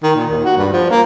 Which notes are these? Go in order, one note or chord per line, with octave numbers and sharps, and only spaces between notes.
D#3
A#2
D#2
F#4
G2
F3
A#3